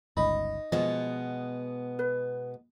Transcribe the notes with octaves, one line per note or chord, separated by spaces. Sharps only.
G1 C#2 D#4 B5
B2 F3 G#3 B3 D#5
B4